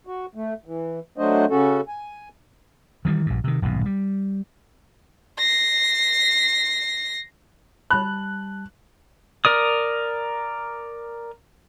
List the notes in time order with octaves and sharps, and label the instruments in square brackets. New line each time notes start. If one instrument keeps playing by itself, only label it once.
[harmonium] F#4
A3
E3
F#3 A3 D4 F#4 C5 D#5
C#3 C#4 F#4 A4
G#5
[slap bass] D#3 E3 F#3 G3
A#1 G2
C3 D#3
D#1 B1 G#2 B2
G3
[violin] A#6 C7
[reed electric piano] G3 A5 [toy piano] B5 [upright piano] F#6
[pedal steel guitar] A#4 D5 D#6